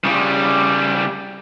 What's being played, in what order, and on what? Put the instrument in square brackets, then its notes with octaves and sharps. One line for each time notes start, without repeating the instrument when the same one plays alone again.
[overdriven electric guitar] C#3 G3